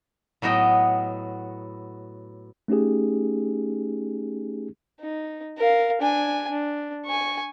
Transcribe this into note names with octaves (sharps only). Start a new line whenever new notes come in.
A2 F#3 B3 D#5 G5
A3 C#4 D#4 G4 G#4
D#4
A#4 F5
D4 G#5
D4
G#5 C#6